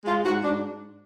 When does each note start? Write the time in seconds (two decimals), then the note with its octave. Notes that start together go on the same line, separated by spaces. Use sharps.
0.05 G#3 F4
0.24 G#2 F#4
0.43 G#2 D4